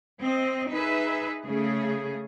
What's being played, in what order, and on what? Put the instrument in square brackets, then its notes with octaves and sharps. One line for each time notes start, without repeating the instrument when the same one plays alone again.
[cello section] C4 D#5
D#4 G#4 B4 E5
C#3 A3 G#4